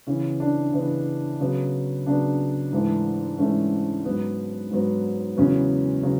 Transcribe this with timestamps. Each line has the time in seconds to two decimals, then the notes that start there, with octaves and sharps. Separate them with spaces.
0.07 C#3 E3 B3 C#4
0.40 D4
0.73 C#3 E3 B3
1.40 C#3 F#3 B3
2.06 C#3 F#3 B3 D4
2.72 G#2 E3 A3
3.38 G#2 E3 A3 C#4
4.05 G#2 F#3 B3
4.70 G#2 F#3 B3
5.37 E2 C#3 F#3 B3 C#4
6.03 C#3 F#3 B3